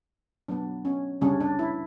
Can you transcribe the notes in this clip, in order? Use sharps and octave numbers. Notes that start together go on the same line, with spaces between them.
F#3 B3 D4
C#4
C#3 G3 C#4 D4
D4
E4